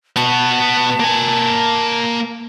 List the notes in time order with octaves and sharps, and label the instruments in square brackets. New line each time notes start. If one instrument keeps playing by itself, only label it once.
[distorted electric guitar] B3 F#4 [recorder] A5
[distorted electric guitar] A#3 G#5